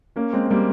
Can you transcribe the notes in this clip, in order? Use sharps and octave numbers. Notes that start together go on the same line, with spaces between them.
A#3 C#4
G#3 C4
C4
G3 A#3